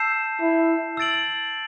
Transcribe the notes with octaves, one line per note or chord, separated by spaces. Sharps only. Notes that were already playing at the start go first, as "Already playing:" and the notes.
Already playing: A5 E6 G6 C7 E7
E4
E6 A6 D7 F#7